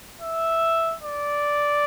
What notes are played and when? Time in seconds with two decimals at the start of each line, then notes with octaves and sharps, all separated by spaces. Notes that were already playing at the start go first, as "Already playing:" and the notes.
0.21 E5
1.03 D5